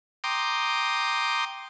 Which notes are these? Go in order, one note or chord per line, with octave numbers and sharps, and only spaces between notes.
G5 A#5 C6 D6 D#6